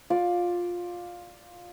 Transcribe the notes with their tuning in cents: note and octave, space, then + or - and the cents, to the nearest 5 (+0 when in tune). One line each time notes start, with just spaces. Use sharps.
F4 +10 D5 +0